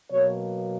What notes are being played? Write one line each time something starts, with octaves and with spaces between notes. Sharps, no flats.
B2 F#3 A#3 C#5